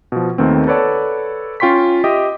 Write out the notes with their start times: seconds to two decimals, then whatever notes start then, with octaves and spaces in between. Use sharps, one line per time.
0.12 B2 F3
0.38 D#2 D#3 A3 B3 C4
0.67 A4 B4 C#5 D5 F#5 A5
1.60 C#4 F4 G5 C6 C#6 B6
2.04 G4 D#5 E5 G5 D#6